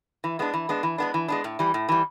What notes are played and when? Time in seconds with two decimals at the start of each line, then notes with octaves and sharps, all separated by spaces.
0.24 E3
0.39 G#3 B3 D4
0.54 E3
0.69 G#3 B3 D4
0.83 E3
0.98 G#3 B3 D4
1.14 E3
1.28 G#3 B3 D4
1.44 A2
1.59 E3 G3
1.74 A2
1.89 E3 G3